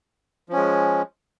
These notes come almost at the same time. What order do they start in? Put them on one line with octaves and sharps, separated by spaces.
F3 C#4 G#3